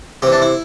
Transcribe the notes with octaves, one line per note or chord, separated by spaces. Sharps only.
C3 E3 G4
D4
E4